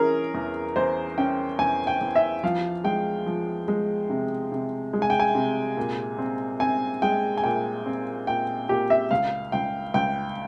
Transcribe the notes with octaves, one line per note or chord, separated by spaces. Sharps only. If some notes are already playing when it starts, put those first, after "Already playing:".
Already playing: E3 C#4 G#4 A#4
E2
E2 C5
C#4 G5
E2 G#5
G5
E2
E5
F3 F5
G#3 G5
F3
G#3
C3
C3
G#3
G#5
G5
G#5
C3
A#2
C4
C4 G#5
G#3 G5
G#5
A#2 G5
C4
A#2 G5
A#2 G4
E5
C#2 F5
C#2 G5
C#2 G5